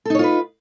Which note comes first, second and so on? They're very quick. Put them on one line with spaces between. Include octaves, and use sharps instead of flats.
A4 D#4 C#5 F4 B4